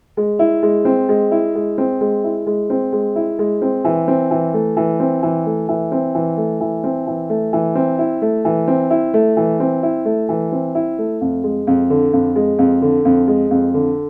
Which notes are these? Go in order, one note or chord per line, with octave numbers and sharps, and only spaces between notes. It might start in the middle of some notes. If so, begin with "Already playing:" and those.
G#3
E4
G#3
C4
G#3
E4
G#3
C4
G#3
E4
G#3
C4
G#3
E4
G#3
C4
E3
C4
E3
A3
E3
C4
E3
A3
E3
C4
E3
A3
E3
C4
E3
A3
E3
C4
E4
A3
E3
C4
E4
A3
E3
C4
E4
A3
E3
C4
E4
A3
F2
G#3
F2
D3
F2
G#3
F2
D3
F2
G#3
F2
D3